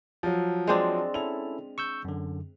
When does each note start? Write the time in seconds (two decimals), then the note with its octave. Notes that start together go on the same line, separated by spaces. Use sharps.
0.23 F3 F#3
0.67 G#3 C4 D4
1.14 C#4 E4 A4 F7
1.78 C#6 E6 G6
2.05 F#2 D3